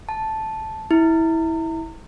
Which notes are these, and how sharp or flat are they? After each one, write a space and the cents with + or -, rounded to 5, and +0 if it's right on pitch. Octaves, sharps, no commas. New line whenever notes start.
A5 -5
E4 -20